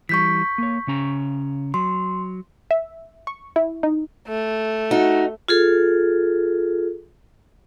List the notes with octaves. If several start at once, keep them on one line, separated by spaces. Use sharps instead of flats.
E3 G3 C#6 G6 B6
A#3 C#5
C#3 C#4 A#5
F#3 C6
E5
C#6
E4
D#4
A3
D#4 F#4
F4 G#4 A4